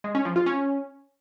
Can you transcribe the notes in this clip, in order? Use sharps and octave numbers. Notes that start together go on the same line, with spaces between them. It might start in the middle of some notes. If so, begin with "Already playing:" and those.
G#3
C#4
F3
F4
C#4